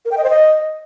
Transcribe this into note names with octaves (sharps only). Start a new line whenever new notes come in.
A#4
G5
D#5
C5
D#5